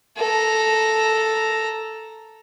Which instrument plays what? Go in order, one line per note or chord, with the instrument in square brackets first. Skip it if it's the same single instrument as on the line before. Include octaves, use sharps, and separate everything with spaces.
[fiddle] A4 A#5